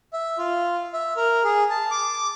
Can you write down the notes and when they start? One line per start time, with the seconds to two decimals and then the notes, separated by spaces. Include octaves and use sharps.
0.13 E5
0.38 F4
0.94 E5
1.17 A#4
1.45 G#4
1.70 A5
1.91 D6